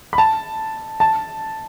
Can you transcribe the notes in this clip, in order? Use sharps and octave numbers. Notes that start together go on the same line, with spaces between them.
B5
A5
A5